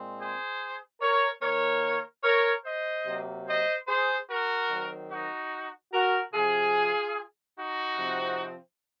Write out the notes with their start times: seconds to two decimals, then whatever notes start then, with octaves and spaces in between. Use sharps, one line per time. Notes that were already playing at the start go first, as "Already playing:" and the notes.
Already playing: A#2 G#3 C4
0.19 G#4 C5
1.01 A#4 C#5
1.42 D#3 A#3 A#4 C#5
2.24 A#4 C#5
2.65 C5 D#5
3.06 C3 F#3 A#3
3.47 C5 D#5
3.88 G#4 C5
4.28 F#4 A#4
4.70 D#3 F#3 C4
5.11 D#4 F#4
5.93 F#4 A#4
6.33 C3 F3 C4 F4 G#4
7.57 D#4 F#4
7.97 C3 F3 C4